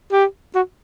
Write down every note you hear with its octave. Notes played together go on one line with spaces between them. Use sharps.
G4
F#4